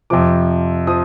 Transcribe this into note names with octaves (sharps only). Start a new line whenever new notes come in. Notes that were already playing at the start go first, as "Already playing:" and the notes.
F2 C3 F3 D6
F3 D#6